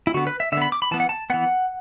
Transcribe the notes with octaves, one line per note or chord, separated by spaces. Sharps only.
E4
D3 B3 F#4
B4
E5
D3 E5
B3 B5
D6
B5
E3 B3 A5
F#5
A5
E3 B3 F#5